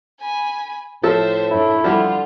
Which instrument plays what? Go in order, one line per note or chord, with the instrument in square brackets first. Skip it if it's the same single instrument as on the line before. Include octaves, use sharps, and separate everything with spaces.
[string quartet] G#5 B5
[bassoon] A2 [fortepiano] F3 A4 E6 [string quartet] C5 E5
[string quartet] F#2 A3 D4 [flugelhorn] E4
[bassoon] D3 [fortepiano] F3 G3 [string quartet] F4